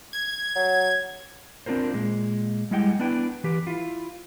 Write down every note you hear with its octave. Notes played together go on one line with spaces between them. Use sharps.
G#6
F#3
C4 D4 F4 A#4 C5
A#2 G#3
G3 G#3 E4 D#5 F#5 G5
B3 D4 E4 B4 G5
E3 G4 B4
E4 F4